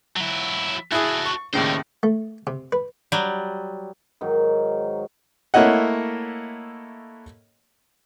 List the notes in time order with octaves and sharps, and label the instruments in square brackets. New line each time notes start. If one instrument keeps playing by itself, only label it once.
[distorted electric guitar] F#3 E4
[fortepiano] E4 G#4 [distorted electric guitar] F#4 A4
[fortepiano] C#6
[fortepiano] D#2 A2 C#3 [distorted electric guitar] C5 D5
[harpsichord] A3
C3
B4
[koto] F#3 G3
[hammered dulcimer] G#2 D#3 F#3
[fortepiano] A3 A#3 E4 C#5 D#5 F#5